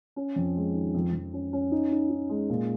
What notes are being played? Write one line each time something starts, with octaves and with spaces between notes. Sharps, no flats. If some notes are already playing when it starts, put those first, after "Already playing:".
C#4
F2
G#3
D#3
F2
F2
C#4
C#4
D#4
D#4
D#4
G#3
A#2